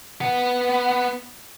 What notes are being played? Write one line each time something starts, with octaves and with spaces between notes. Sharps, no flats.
B3 F#5